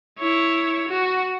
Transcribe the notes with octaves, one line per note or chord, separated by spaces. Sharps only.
E4 C#5
F#4